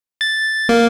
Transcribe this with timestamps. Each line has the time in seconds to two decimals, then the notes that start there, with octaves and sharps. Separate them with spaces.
0.21 A6
0.69 A#3